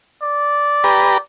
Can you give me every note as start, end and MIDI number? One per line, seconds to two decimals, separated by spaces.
0.23 1.20 74
0.84 1.18 67
0.84 1.18 71
0.84 1.18 82